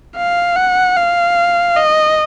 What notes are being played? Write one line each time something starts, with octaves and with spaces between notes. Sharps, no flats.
F5
F#5
F5
D#5